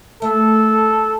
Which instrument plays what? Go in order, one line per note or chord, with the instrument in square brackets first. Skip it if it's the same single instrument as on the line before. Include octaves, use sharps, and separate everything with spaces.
[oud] A3 [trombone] A4